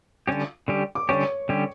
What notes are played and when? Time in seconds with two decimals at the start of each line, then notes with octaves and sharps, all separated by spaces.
0.28 D3 G3 C#4 G4
0.68 D3 G3 C#4 G4
0.95 D6
1.09 D3 G3 C#4 G4 C#5 C#6
1.49 D3 G3 C#4 G4